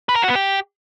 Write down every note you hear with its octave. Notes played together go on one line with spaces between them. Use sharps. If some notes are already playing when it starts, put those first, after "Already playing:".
B4
A#4
F#4
B3
G4